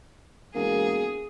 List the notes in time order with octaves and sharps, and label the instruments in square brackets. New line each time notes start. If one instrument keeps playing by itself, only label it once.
[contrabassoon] E1 [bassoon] A#3 [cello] G#4